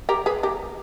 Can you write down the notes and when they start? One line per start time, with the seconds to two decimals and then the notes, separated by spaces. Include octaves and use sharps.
0.09 G4 A#4
0.26 G#4 B4
0.43 G4 A#4